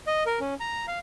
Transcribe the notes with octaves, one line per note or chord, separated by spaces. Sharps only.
D#5
A#4
C#4
A#5
F5